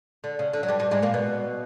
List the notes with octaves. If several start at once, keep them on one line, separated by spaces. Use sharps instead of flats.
D3
C#3
D3
F#3
G2 G3
G2 G3
G#2 G#3
A#2 A#3
B2 B3